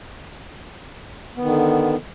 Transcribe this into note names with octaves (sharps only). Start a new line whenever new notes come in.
D3 D#3 B3